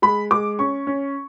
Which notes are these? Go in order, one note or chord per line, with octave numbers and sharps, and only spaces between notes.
G#3 B5
G#3 D6
C#4 C#6
C#4